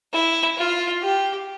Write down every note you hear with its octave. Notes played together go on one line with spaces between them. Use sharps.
E4
F4
G4